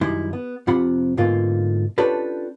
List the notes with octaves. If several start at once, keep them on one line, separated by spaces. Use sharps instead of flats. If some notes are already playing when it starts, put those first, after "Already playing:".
F#2 D#3 G3 E4 C6
B3
F2 C3 F4 F#5 B5
G#2 B2 D3 A#3 F4
C#4 D4 F4 G4 A4 B4